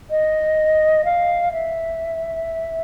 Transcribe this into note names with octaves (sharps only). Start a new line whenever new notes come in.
D#5
F5
E5